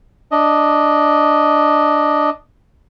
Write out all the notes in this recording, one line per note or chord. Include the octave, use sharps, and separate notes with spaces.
D4 D#5